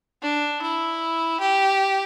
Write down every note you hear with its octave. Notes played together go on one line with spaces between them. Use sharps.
D4
E4
G4